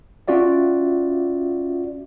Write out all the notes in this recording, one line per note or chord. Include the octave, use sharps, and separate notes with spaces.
C#4 F4 F#4 D5 E5